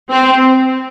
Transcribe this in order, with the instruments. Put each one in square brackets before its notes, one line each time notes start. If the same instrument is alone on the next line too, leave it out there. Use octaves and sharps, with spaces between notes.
[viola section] C4